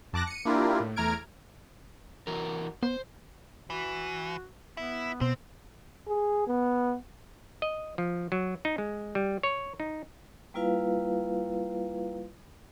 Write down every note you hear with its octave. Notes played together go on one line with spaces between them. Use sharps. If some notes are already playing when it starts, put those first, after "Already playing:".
F2 A5 D6 F#6 A#6
C#7 D#7
A#3 D4 E4 F4 G4 A#4
A2
E2 A3 A#5 F6 G#6 D7
E3 F#4 A#4
B3 C5
E3 F#4
B3 E4
B2 C4 C5
G#4
B3
D#5
F3
F#3
D#4
G#3
G3
C#5
D#4
G3 A#3 E4 F4 B4 F5